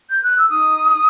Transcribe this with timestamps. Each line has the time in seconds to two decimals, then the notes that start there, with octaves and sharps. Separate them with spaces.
0.10 G6
0.23 F#6
0.37 E6
0.50 D#4 D#6